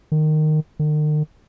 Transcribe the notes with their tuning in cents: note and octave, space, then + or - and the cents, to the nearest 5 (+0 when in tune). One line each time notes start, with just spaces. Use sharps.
D#3 -15
D#3 -45